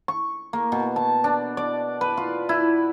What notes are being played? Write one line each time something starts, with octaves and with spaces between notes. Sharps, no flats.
C#6
A#3
B2
A5
D4
D5
B4
F4
E4